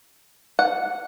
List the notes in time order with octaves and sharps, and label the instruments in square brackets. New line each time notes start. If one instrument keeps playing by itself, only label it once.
[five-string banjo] F#5